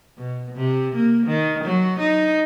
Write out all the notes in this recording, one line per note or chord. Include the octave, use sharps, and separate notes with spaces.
B2
C3
A#3
D#3
F#3
D#4